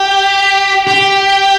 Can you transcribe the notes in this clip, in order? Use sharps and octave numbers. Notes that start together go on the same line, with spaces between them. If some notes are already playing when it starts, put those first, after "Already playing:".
Already playing: G4
G4